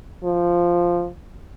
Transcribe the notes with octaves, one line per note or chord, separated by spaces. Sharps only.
F3